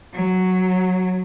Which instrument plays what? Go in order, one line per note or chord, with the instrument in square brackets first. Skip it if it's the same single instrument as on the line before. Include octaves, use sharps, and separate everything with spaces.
[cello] F#3